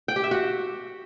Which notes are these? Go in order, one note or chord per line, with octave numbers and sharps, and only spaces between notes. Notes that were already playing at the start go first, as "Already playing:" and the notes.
G5
G4
E5
F#4